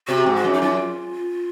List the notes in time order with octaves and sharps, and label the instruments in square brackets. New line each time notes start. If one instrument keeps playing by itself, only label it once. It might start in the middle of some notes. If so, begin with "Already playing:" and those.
[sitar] C3 [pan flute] F#4
[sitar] G#2
[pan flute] F#4
[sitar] F#2
[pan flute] D#4
[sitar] F#2 [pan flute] F4